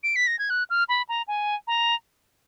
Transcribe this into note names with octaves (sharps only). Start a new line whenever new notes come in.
D7
B6
A#6
G#6
F#6
F6
B5
A#5
G#5
A#5